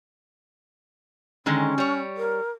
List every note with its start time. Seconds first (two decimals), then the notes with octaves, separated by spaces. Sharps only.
1.46 D3 D#3 G#3 C#4
1.78 G3 C#5
2.17 A#4